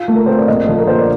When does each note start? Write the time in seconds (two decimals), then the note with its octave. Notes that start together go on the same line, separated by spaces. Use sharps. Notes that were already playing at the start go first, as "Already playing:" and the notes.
Already playing: F4 F5
0.08 A3
0.16 A#4
0.26 C4 C5
0.37 D5
0.48 A#1 D#5
0.68 F3 A4
0.78 A#4
0.87 A#1 C5
0.98 D5